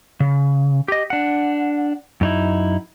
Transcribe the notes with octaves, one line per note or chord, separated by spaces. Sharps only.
C#3
G4 D#5
D4 F#5
F#2 D#4 E4